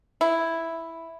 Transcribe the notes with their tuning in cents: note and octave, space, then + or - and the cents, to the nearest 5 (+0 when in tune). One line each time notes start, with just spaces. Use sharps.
E4 +0